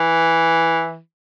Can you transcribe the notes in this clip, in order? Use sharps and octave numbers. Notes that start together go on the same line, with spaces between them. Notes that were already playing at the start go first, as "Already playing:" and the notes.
Already playing: E3